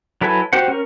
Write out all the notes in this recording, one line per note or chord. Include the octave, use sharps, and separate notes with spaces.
F#3 E4 A4 B4 G#5
F#4 G4 C5 F#5
C#4 A#4